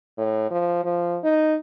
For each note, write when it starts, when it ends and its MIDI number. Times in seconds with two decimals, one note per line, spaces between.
0.18 0.49 45
0.51 0.80 53
0.84 1.19 53
1.24 1.56 63